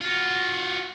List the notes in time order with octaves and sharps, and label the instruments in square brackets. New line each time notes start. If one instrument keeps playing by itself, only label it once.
[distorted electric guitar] F4 F#4